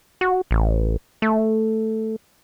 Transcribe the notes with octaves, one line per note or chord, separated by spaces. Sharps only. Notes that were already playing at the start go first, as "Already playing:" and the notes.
F#4
A1
A3